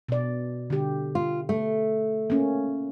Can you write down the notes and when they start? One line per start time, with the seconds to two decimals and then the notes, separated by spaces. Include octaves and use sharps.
0.09 B2 D5
0.70 D3 G4
1.15 F4
1.49 A3
2.30 A#3 C#4